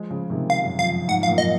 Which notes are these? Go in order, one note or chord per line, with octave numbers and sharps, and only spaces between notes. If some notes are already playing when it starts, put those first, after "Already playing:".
Already playing: F3 G#3
C#3 F3
C3 D#3
F5
F#2
F2 F5
F2 G#2 F#5
F5
F#2 A#2
D#5